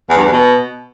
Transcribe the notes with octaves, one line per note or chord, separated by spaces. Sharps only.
E2
G2
E2
B2